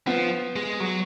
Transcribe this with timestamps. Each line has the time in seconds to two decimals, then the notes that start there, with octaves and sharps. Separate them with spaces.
0.07 F3 B3
0.56 G#3
0.80 F#3